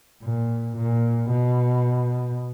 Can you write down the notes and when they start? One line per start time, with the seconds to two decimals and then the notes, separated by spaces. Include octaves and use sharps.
0.23 A#2
0.76 A#2
1.29 B2